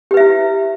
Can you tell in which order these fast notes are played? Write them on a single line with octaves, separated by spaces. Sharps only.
G4 B4 E5 E4